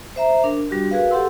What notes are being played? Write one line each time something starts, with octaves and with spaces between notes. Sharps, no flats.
C5 E5 A#5
D4 A#4
G3 D4 F#4 G4
F#4 G#4 A#4 B4 F5
G4 A4 F#5 C6 E6